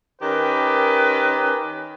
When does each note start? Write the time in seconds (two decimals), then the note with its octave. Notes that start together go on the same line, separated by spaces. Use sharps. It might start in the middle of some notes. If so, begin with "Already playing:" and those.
0.21 D#3 C#4 G4 A#4 B4